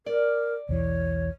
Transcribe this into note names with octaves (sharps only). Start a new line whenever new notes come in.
A#4 D5
B1 E2 E3 C#5